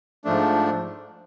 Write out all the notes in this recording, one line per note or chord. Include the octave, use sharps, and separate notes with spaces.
G#2 F3 A3 D4